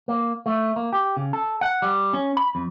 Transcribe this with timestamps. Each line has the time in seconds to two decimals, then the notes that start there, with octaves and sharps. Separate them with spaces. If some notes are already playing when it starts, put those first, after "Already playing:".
0.08 A#3
0.46 A3
0.76 A#3
0.93 G4
1.17 C#3
1.33 A4
1.61 F#5
1.82 G3
2.13 C#4
2.37 B5
2.55 F2